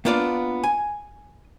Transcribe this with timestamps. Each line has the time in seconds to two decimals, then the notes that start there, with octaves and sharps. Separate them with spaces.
0.05 A#3 B3 D4 F4 D5
0.64 G#5